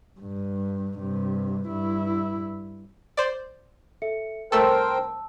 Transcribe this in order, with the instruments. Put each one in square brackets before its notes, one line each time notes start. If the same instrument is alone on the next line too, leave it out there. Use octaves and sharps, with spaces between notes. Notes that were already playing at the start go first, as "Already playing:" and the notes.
[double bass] G2
G2 C3
G2 E4
[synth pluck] C5 D5
[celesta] A4 E5 C#7
[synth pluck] C2 A3 A4 [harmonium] A#4 C5 G5 [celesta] A5 E6